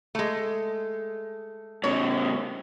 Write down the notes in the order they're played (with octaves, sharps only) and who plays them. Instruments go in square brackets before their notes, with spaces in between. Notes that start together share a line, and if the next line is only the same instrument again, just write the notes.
[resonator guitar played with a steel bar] G#3 A3
[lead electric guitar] A2 C#3 [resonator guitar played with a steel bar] C#5